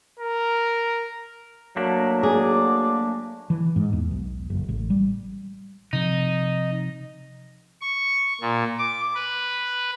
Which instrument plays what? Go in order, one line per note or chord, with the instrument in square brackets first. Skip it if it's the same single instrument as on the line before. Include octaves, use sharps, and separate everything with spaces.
[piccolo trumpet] A#4
[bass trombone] F#3 [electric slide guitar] A3 A#3 D4
[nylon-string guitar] G#4 [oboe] D5
[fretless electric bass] E3
G#2
E2
B1
F#1
A1
G3
[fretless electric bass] C3 F3 [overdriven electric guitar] D#4
[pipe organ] C#6
A#2
D6
B4